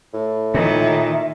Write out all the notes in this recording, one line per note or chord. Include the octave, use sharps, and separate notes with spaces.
A2
A#2 D#3 E5